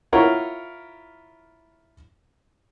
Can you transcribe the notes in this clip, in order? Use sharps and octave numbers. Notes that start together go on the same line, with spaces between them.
E4 F4 A#4 C#5 F#5